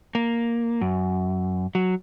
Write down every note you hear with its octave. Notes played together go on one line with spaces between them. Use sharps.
A#3
F#2
F#3